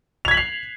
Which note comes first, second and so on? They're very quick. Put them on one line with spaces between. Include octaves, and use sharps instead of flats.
F7 G#6 B6 F#7 C7